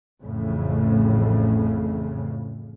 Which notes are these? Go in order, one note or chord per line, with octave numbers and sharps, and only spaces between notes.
A1 F2 A2 C#3